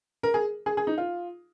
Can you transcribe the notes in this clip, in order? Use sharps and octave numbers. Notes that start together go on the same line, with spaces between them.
A#4
G#4
G#4
G#4
D#4
F4